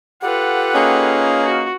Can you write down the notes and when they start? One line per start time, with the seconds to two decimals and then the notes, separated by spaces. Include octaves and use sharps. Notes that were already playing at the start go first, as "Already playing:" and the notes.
0.22 F4 G4 A4 B4 F#5
0.75 A#3 C#4 D#4 G#4
1.45 F#4